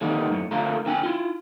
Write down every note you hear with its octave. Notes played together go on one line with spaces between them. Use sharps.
D3 D#3 G3 A#3 B3 D#4
F#2 A2
D3 A3 F4 A#4
D2 D4 G5 G#5
E4 F4